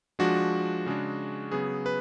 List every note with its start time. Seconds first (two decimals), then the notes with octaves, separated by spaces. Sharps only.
0.19 F3 G#3 D4 F#4
0.86 C#3 G#3 D4
1.51 C#3 F#3 B3 G#4
1.86 B4